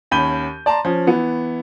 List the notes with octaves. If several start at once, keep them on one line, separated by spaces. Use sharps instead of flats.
D#2 C#4 B5 G6 D#7 G7
D5 A5 A#5 C6
F3 C#4
E3 B3 E4